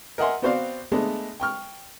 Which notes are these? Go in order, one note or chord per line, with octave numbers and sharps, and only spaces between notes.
A#4 D#5 E5 F#5 G#5 C6
B3 C4 F#4 C5 D5 F5
G#3 A3 B3 D4
G5 C#6 F6